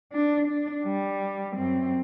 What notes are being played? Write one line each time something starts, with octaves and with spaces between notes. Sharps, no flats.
D4
D4
G3
F#2 C4